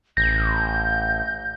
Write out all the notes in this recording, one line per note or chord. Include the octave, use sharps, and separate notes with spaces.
A1 G6 A#6